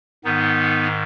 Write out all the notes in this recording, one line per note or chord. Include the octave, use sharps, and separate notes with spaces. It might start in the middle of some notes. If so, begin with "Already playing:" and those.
G#2 D#3 B3 D#4